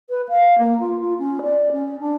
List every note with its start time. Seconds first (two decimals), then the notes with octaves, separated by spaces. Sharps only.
0.10 B4
0.29 F5
0.58 A#3
0.80 F4
1.00 F4
1.19 C#4
1.42 D5
1.72 C#4
2.00 D4